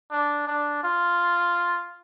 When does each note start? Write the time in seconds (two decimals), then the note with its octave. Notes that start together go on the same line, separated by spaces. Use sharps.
0.11 D4
0.47 D4
0.83 F4